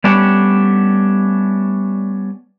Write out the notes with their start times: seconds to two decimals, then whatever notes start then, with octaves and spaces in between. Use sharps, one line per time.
0.04 G3 A3 B3 C#4 D4 G4